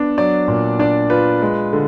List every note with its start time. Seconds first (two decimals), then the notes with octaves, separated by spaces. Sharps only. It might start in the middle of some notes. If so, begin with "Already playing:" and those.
Already playing: B3 D4
0.18 F#3 D5
0.48 A#2
0.79 D4 D5
1.10 F4 B4
1.42 G#3
1.73 D3